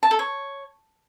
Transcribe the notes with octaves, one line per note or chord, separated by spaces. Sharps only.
A5
A4
C#5